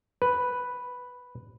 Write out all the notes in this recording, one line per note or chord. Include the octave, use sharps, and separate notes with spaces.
B4